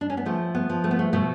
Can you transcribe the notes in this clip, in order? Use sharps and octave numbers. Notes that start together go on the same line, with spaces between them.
D4
C#4
B3
F3 A3
B3
F3
A3
B3
A3
B2 A3